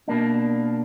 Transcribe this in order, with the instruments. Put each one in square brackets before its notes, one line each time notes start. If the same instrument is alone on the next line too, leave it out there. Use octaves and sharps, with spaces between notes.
[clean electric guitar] B2 A#3 D4